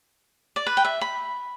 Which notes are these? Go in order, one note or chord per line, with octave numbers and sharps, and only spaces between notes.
D5
B4
G5
E5
B5